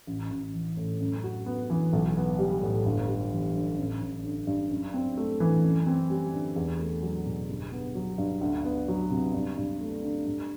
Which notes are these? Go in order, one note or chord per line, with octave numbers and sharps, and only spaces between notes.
A1
A1
E3
A2
F#2
F#4
B3
E3
B1
B3
G3
A2
G1
G3
E3
G2
A1
A1
D3
G2
F#2
C4
A3
E3
F#2
C4
G3
D3
E2
A3
F#3
B2
G1
B3
F#3
G2
D2
B3
F#3
C3
G2
G2
A3
D3
G2